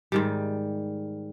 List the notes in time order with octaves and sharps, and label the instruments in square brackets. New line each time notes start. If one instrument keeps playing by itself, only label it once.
[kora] G#2 D#3 G3